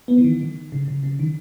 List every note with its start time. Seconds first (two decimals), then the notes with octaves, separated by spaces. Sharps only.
0.08 B3
0.18 E3
0.24 D#3
0.41 D#3
0.72 C#3
0.88 C#3
1.03 C#3
1.19 D#3